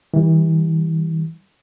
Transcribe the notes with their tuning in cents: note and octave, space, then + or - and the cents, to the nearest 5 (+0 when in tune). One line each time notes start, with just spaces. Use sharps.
E3 -35 G3 +0